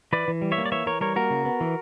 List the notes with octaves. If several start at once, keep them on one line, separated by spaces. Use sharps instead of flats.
E3 B4 D5
E3
G3
C#5 E5
A#3
D5
E3 C#5 E5
E3 A#4 C#5
G3 A#4 C#5
A#3 F#4 A#4
C#3
B3
E3